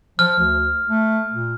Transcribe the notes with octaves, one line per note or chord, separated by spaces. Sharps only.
F3 F6
D2
A3
A#2